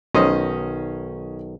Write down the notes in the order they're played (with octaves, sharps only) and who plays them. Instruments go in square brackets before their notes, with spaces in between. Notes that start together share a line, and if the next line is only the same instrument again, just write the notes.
[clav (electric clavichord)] B1 D#3 [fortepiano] C#4 C5 D#5